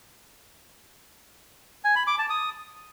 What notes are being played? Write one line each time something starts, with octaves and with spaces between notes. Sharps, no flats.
G#5
B5
D6
A5
D#6